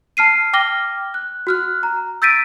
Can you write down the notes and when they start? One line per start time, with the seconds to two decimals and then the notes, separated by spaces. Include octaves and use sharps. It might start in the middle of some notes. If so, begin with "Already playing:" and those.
0.17 A5 F6 C7 D#7
0.53 G5 D6 F6 A#6 G7
1.14 F#6
1.47 F#4 F6 F#6
1.83 A#5
2.22 E6 G6 A6 B6 D7 D#7